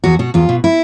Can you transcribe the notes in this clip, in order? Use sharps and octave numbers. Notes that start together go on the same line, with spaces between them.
E2 F#4
B2 F#4
E2 F4
B2
E4